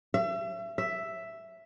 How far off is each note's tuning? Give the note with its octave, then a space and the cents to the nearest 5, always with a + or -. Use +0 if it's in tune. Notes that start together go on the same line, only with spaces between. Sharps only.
E5 +35
E5 +5